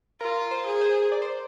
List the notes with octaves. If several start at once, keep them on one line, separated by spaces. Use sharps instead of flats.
F4 A#4 A#5
C5
G#4
C5
D5
C5